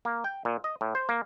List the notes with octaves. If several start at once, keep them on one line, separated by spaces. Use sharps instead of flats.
A#3
G5
A#2
D#5
A2
C5
A#3